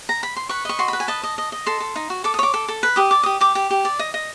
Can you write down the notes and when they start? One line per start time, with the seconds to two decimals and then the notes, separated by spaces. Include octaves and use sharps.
0.09 A#5
0.23 B5
0.36 C6
0.49 B4 C#6
0.65 D#5 C#6
0.79 F#4 C6
0.88 B4 B5
1.00 G#5
1.08 D#5 A5
1.23 D#5
1.38 D#5
1.52 D#5
1.66 A4 C6
1.80 A4
1.96 D#4
2.10 F#4
2.24 A4 D6
2.34 D#6
2.39 C#5 D6
2.54 A4
2.68 A4
2.83 B4
2.96 G4 D#6
3.11 D5 D6
3.23 G4 D#6
3.41 G4 D6
3.55 G4
3.70 G4
3.85 D5
3.99 D#5
4.14 D#5